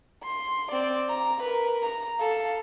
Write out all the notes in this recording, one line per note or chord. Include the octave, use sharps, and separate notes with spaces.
C6
C4 D5
A#5
A#4 B4
A#5
A4 F5